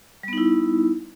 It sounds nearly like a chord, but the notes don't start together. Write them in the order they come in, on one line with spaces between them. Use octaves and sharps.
G3 B3 D#4 E4